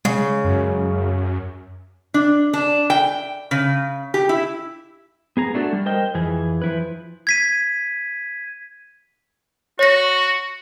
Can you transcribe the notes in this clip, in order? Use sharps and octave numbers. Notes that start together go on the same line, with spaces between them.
C#3 G#3
F#2
D4
D4
G5
C#3
G4
E4
B3 G#4 A#5
A3 D4 F#4 G4 A4
G3
A#4 C5 D#5 G5
F2 E3 G#4
F3 E4 B4
G#6 B6 D#7
F#4 C#5 A#6